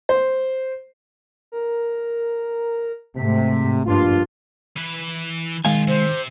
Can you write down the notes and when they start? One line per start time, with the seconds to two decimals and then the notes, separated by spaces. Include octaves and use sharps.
0.09 C5
1.52 A#4
3.16 G#2 C3 A3 B6
3.86 A#1 G2 D4 F4 C6
4.77 E3 B4
5.65 B1 D#3 G#3 F4 F5 G#5
5.88 C3 C5